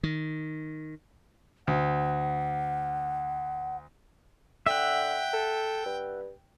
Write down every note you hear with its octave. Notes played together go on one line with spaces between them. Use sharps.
D#3
D2 F#5
D3 E5 F#5 G5
A4
G2